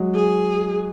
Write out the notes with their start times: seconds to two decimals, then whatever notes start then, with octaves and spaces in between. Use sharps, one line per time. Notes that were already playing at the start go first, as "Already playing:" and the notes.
Already playing: F#3 G#3
0.14 G#4